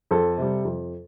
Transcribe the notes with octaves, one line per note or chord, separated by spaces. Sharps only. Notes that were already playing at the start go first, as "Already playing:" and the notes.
F2 A4
C3 G3
F2